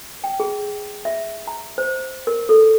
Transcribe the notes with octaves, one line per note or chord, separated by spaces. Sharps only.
G5
G#4
E5
A#5
C5
A#4
A4